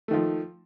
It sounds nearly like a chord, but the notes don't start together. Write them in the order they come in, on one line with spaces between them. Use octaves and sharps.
A3 D#3 F3